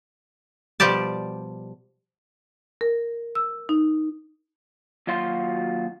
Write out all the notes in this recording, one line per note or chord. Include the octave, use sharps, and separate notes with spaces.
B2 F3 G3 G4 D5 A5
A#4
E6
D#4
D#2 F#3 F4 F#4 C6